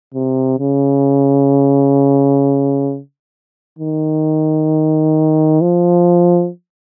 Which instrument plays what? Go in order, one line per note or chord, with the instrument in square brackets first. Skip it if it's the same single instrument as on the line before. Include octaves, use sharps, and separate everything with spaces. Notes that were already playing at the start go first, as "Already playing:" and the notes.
[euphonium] C3
C#3
D#3
F3